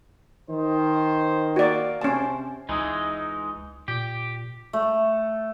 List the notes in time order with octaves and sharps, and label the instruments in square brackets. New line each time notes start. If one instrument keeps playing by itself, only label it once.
[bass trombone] D#3 [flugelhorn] C5
[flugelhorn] A#3 [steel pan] F#4 D5
[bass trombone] C3 [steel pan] C#4 A5 [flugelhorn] C5
[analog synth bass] C#2 [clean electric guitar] E3 G#3 D#4
[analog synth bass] A#2 [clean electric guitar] G4
[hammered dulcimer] A3